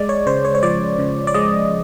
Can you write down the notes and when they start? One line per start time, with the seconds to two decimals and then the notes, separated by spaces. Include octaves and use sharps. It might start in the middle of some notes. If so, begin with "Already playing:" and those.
Already playing: G#3 D5
0.09 C#5
0.26 C#3 C5
0.45 C#5
0.55 C#5
0.63 F3 D5
0.99 C#3
1.27 D5
1.34 G#3 D#5